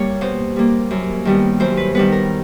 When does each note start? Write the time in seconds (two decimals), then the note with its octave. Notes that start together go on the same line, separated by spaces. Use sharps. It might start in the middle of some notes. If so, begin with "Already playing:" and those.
Already playing: G3 A#3 C#5
0.21 B2 C5
0.56 G3 A#3
0.91 F#2
1.25 D#3 G3 B3
1.60 F#2 C5
1.77 B4
1.95 D#3 G3 B3 B4
2.12 A#4